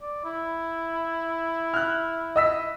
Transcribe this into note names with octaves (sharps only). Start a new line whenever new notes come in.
D5
E4
F6 F#6
D#5 E6 B6